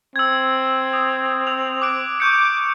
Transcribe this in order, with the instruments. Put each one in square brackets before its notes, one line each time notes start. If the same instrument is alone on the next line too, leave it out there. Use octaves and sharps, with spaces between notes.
[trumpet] C4 [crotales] E6 G#6
[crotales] D#6
E6 F7
D6 F#6 D7
[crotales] C#6 G6 C#7 [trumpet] D6